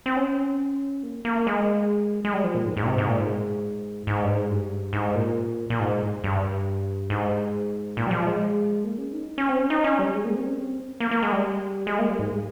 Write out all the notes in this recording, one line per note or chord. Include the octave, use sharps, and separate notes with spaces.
C4
C#4
A#3
A#3
G#3
G#3
G3
F3
A#2
G#2
G#2
A#2
C3
G#2
A#2
G#2
G#2
G2
G#2
G2
G#2
A#2
A#2
G#2
G2
G#2
A#2
G3
F3
G#3
A#3
C#4
D#4
C#4
C4
C#4
D#4
C#4
G3
G#3
A#3
C4
C#4
C4
A#3
A#3
G#3
G3
G#3
A#3
G3
G#2